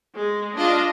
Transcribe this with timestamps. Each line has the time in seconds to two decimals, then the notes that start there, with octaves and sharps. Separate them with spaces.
0.16 G#3
0.57 D4 F4 D#5